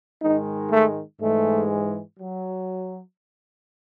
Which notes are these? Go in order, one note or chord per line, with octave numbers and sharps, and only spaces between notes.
G#2 D#3 G#3 D#4
A3
G#2 E3 G#3 A3
F#3